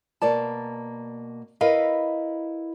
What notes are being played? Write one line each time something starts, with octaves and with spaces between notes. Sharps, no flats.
B2 A#3 D5 A5
E4 A#4 B4 D#5 F5